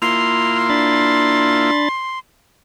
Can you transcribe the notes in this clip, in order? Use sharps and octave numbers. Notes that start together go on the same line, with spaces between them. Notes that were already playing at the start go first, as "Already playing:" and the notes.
A#3 E4 F4 C6 F6
D4 B5 A6